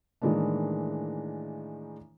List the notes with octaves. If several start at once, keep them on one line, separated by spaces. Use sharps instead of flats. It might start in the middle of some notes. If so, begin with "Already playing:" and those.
A2 D#3 E3 G#3 A#3 D4